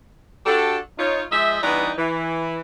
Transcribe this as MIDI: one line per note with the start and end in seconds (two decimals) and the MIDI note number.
0.46 0.78 62
0.46 0.78 66
0.46 0.78 67
0.46 0.78 69
0.98 1.23 63
0.98 1.23 65
0.98 1.23 73
1.31 1.59 53
1.31 1.59 56
1.31 1.59 75
1.31 1.59 76
1.62 1.91 43
1.62 1.91 52
1.62 1.91 59
1.62 1.91 63
1.62 1.91 74
1.62 1.91 82
1.97 2.61 52